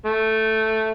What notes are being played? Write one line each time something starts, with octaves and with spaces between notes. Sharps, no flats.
A3